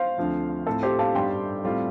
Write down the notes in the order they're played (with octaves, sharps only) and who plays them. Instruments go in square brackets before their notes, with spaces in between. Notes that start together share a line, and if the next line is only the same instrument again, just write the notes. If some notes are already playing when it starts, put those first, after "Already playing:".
Already playing: [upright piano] C5 F5
[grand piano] D2 D3 F3 C4 F4
[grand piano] A2 A3 C4 F4 [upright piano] A4
[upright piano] G4 C5
F5 A5
[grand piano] G2 G3 D4 [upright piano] G5 C6
[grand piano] A2 G3 C4 F4